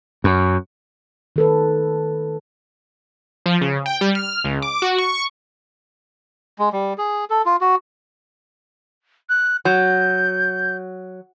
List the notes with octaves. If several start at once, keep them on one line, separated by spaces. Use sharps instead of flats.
F#2
D#3 A4 B4
F3
C#3
G5
G3
F6
C#2
D6
F#4
C#6
G#3
G3
G#4
A4
F4
F#4
F#6
F#3 G6